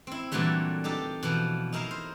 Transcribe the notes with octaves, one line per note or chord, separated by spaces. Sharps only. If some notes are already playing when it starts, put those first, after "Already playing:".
C4 E4
A#2 D3 E3 F#3 G3 A3
D4 D#4 G4 A4
B2 E3 F3
D#4 E4 A#4 D#5 F5
C5